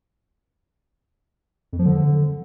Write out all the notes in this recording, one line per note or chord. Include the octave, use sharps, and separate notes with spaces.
F2
F3
D3